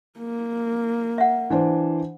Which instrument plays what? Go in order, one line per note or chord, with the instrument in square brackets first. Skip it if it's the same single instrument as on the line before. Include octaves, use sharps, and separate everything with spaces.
[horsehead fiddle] A#3
[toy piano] E5 F#5
[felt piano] E3 D4 C5